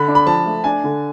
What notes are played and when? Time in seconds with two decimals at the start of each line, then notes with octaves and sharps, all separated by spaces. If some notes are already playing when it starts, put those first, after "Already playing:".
Already playing: D3 B5
0.08 D4
0.15 B5
0.26 F3 A5
0.46 A3
0.64 D4 G#5
0.84 D3